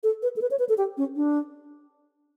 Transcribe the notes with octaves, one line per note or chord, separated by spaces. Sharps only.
A4
B4
A4
B4
C#5
B4
A4
G4
C#4
D4